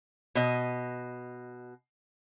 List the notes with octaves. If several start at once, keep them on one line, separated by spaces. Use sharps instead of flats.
B2 D#5